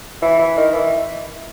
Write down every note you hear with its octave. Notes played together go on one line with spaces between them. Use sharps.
E3
E3
D#3
E3